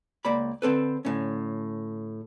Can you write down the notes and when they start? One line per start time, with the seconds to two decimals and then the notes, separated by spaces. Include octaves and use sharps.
0.25 C#2 A#3 D5 B5
0.62 D3 C4 A4 B4
1.05 A2 D3 C#4